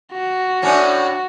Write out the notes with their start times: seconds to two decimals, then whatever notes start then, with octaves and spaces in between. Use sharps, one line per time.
0.13 F#4
0.62 A2 C#4 D4